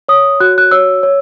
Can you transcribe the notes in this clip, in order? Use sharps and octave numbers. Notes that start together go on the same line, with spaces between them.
C#5 D#6
F#4 F#6
F#6
C#5 E6
C#5